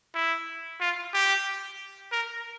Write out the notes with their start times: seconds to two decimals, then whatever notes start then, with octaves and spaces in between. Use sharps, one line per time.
0.15 E4
0.81 F4
1.14 G4
2.12 A#4